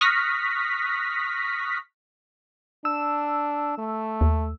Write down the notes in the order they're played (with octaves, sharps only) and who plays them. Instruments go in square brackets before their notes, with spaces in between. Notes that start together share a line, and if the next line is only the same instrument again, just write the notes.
[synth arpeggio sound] C#6 D#6 F6 F#6 A#6 B6
[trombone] D4 [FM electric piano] E6
[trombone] A3
[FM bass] D#2